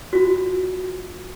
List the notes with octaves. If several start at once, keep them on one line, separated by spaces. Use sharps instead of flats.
F4 F#4